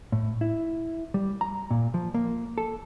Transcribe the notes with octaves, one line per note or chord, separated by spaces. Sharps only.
A2
E4
G3
A#5
A#2
F3
A#3
A4